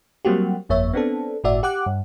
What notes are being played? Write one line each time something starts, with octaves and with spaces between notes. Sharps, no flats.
F#3 G3 A#3 C4 F#4 G4
G1 F2 A#3 C#5 E5
B3 C4 D4 A4
G1 A2 F#4 D5 E5
G4 F#5 D6 F#6
G2